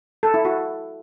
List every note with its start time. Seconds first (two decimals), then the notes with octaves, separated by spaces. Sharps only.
0.23 A4
0.34 E4
0.45 F#4